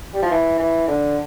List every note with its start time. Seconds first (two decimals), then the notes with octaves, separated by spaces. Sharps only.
0.14 G3
0.23 F3
0.31 E3
0.59 E3
0.88 D3